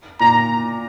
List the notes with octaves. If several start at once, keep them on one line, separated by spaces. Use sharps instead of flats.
A#2 A#5